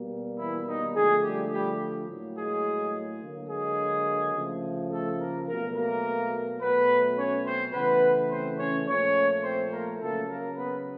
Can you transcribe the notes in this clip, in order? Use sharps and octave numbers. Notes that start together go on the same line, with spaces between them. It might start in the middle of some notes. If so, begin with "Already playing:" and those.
Already playing: B2 G3 A#3
E3 E4
D#3 D#4
D3 F3 G#3 A3 G#4
G3 G4
G3 G4
A2 F#3 A#3
G#3 G#4
D3 F#3 A#3
G#3 G#4
C#3 F3 A3
A3 A4
A#3 A#4
B2 F#3 A3 A#3 A#4
A#3 A#4
B2 F#3 A3 B3 B4
C#4 C#5
C4 C5
C#3 E3 A3 B3 B4
C4 C5
C#4 C#5
A#2 F3 A3 C#4 C#5
C4 C5
A#3 A#4
C#3 F#3 A3 A#3 A4
A#3 A#4
B3 B4